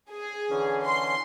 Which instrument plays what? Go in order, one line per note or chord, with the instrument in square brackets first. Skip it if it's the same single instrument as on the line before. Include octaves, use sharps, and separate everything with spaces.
[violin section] G#4
[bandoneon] D3 E3 C#4
[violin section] C6